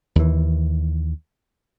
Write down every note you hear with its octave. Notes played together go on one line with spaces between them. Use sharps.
D#2 E3